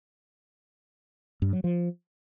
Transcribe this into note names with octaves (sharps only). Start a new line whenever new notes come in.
G2
F#3
F3